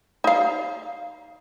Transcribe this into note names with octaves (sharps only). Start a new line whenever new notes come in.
D#4 F5